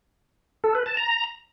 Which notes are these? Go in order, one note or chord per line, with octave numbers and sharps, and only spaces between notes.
A4
B4
A5
A#5